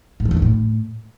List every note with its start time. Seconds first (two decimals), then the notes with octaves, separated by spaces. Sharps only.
0.20 A2
0.25 F3
0.31 E2
0.37 D#3
0.42 A2